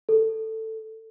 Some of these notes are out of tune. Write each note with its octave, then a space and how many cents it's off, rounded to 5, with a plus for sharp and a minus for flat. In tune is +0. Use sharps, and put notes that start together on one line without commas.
A4 +10